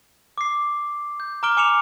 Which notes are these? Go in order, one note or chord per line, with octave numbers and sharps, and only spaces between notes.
D6 C7
G6
A#5 D6 F6 D7 G7
G#5 D6 C#7 E7 F7